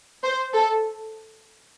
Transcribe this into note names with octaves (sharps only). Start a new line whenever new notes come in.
C5
A4